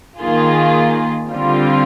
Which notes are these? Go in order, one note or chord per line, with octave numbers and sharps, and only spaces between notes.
D#3 A#3 F4 G#4
D3 G3 C4 F4